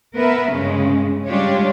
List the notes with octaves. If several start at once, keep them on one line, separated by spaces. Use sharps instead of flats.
B3 A#4 B4 E5
G2 C#3 G#3 C#4
G3 G#3 D4 F4 G4 C#5